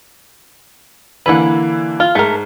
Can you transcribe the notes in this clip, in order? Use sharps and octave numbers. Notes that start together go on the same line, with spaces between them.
D3 E3 A#3 B4 F#5
F4 F6
G#2 A3 A#4